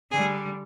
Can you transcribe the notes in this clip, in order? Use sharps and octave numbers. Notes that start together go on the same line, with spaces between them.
D3 G3 G#4